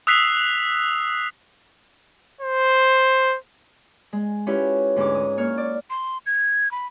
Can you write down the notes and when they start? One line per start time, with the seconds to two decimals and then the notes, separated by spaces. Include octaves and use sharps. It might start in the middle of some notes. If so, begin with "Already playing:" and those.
0.07 D#6 E6 F#6 B6 C7 F7
2.41 C5
4.13 G#3
4.47 C#4 E4 F4 G4 B4 C#5
4.96 D2 G#2 C#4 E4 D6
5.15 D#6
5.37 A#3 C#5 C#6 F6
5.58 D5
5.90 C6
6.26 G#6
6.71 B5